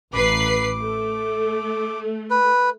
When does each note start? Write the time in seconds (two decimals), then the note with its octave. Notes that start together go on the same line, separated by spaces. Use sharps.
0.13 A1 B4 D6 C7
0.80 A3
2.30 B4